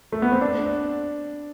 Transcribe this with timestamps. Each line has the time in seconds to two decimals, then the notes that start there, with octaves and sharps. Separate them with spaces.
0.12 A3
0.22 B3
0.32 C4
0.41 D4